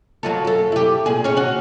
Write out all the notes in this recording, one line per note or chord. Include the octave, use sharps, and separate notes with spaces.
F#3 F4 A4
F#2 A4
E4 G4
A#2 G#4
C#4 C#5
C#4 F#4